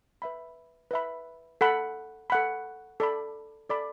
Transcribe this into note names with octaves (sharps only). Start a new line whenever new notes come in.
B4 E5 B5
B4 E5 B5
A4 F#5 B5
A4 F#5 B5
A4 D5 B5
A4 D5 B5